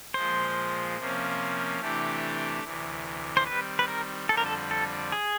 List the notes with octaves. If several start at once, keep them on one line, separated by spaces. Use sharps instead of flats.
A#2 F3 G#3 C5
C3 F3 A#3 C#4
C3 E3 A3 D4 G4
D2 C3 E3
C5
D#3 G3 C4 B4
B4
A#4
F2 D3 G3 C4 A4
A#4
A4
A4
G#4